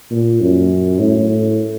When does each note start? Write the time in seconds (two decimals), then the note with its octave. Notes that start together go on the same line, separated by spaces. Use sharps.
0.11 A#2
0.41 F#2
1.00 A2